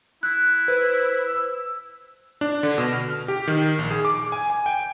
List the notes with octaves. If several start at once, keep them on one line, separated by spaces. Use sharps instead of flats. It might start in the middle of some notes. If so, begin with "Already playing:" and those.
E4 F#6
B4 C5
E6
D4
D3
B2
F6
G4
D#3
A#1
G#4
D6
G#5
G#5
G5